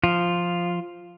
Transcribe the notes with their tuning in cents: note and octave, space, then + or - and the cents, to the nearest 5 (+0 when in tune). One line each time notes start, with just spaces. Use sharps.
F3 +0 F4 +0